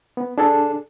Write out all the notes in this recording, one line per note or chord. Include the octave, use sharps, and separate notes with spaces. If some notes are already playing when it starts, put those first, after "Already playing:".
B3
D4 G#4 A4